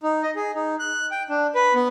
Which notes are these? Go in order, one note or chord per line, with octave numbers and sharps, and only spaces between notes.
D#4
D#5
G#4
D#4
F#6
G5
D4
B4
B3